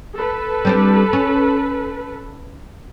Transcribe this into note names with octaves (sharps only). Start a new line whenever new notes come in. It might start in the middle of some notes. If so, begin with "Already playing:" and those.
A4 B4
G3 C4 D4
C#4